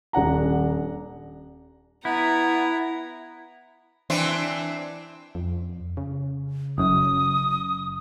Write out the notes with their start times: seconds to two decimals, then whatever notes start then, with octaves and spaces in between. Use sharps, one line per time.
0.13 D#1 D4 F#5 A#5
2.05 B3 E4 A#5
4.10 E3 C4 D4
5.35 F2
5.97 C#3
6.78 F#1 F#2 D#6